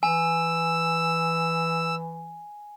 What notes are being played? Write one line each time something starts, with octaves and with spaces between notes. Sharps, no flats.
E3 G#5 E6